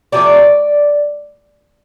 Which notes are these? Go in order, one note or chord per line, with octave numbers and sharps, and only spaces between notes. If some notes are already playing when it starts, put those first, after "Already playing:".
C3 F3 A3 D4 D5